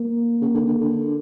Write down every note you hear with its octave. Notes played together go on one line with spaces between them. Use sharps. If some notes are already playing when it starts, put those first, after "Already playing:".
Already playing: A#3
C#3
D3
D3
D3